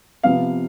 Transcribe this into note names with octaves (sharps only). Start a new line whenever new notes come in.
C3 F3 B3 F5